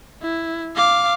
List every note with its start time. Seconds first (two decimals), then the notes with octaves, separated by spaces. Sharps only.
0.22 E4
0.76 F5 D6